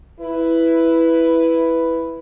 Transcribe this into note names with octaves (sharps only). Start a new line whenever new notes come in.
E4 B4